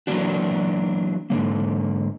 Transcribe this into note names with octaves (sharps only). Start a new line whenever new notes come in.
E3 F#3 A#3 D4 F#4
G#2 D3 E3 A#3